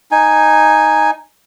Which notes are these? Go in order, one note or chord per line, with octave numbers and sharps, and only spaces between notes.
D#4 G#5